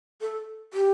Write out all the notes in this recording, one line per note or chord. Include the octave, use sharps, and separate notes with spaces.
A4
G4